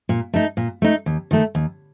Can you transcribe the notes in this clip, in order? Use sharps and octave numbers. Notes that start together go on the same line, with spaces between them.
A#2
A3 D#4
A#2
A3 D#4
D#2
D#3 A3
D#2